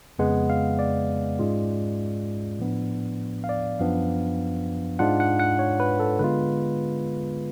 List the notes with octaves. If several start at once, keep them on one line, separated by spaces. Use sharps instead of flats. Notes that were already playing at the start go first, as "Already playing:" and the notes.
F2 C#3 G#3 B3 F#5
F5
D5
G#2 G#3 C#4 F4
A2 F3 B3 D4
F5
D5
F#2 F3 B3 D4 F5
G#2 G#3 D4 F4 F#5
F#5
F#5
C#5
B4
A4
D3 G#3 B3 F4 B4